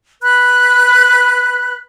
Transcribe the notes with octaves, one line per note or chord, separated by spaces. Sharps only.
B4 B5 F#6